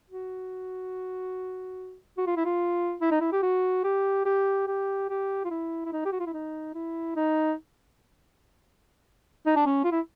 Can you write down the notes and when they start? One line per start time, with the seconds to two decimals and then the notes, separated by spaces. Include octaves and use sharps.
0.10 F#4
2.18 F#4
2.27 F4
2.37 E4
2.45 F4
3.01 E4
3.11 D#4
3.21 E4
3.32 G4
3.43 F#4
3.84 G4
4.25 G4
4.67 G4
5.09 G4
5.45 F4
5.51 E4
5.85 E4
5.92 D#4
6.05 G4
6.12 F#4
6.20 F4
6.26 E4
6.33 D#4
6.75 E4
7.16 D#4
9.46 D#4
9.56 D4
9.66 C#4
9.84 F4
9.92 E4